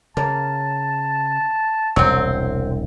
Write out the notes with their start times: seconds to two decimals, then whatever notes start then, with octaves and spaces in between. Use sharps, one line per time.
0.17 C#3 A#3 A5
1.96 E1 C2 F#3 C4